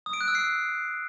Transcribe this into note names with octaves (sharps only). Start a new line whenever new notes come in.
D#6
D7
F#6
E6
C7